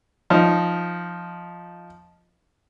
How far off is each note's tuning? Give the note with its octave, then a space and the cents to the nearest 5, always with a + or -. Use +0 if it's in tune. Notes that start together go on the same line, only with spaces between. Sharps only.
F3 +0 D#4 +0